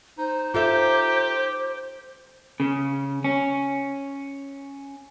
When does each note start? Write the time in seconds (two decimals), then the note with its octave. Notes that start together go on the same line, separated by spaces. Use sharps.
0.19 D#4 C5
0.54 F4 G4 A4 E5
2.60 C#3
3.24 C#4